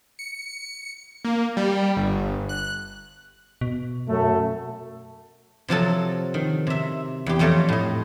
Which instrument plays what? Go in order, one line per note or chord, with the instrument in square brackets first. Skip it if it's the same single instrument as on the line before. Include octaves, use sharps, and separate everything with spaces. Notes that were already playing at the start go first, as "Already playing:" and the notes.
[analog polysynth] C#7
A#3
G3
G1
F#6
[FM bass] B2
[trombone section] F#2 A3
[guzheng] C3 F3 F#3 A4
D#3
C3 E5
E2 G4
F2 G3 A3 F4 C#5 A#5
A2 D#5